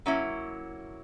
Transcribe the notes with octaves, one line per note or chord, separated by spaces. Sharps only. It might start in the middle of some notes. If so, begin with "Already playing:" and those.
F#3 A#3 C#4 E4